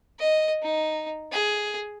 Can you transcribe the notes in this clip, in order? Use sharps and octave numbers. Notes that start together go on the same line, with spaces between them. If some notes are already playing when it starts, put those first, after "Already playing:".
D#5
D#4
G#4